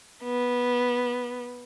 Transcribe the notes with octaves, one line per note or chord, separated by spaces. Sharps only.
B3